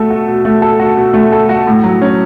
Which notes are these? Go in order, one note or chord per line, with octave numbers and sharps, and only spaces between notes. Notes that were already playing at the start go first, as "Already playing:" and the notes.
Already playing: B2 A3 F#4 A4
F#4
B2
A3
A4
F#4
B2
A3
A4
F#4
A2
F#3
C#4